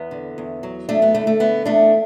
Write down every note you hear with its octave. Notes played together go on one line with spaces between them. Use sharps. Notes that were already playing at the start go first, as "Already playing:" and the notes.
Already playing: E2 B3
D3
E2
F#3
E2 A3 D4
B3
D3 A3
A3
D3 B3
E2 A3 D4